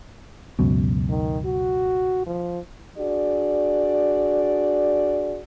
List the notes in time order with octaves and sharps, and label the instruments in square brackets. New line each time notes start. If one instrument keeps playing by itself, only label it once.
[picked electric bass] C#2 F#2 B2
[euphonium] D#3
F#4
F3
[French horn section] D4 F#4 G#4 D5